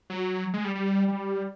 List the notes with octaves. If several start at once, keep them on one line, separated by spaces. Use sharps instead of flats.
F#3
G#3
G3
G3
G3